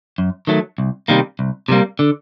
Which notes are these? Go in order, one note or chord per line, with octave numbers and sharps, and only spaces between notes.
F#2
D#3 F#3 A3
C2
C3 D#3 G3 A#3
C2
C3 D#3 G3 A#3
D3